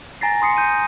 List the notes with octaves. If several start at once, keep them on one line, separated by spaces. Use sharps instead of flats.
G#5 A#5 A6 A#6 C7
C6 D#6 C7 C#7
G6 D#7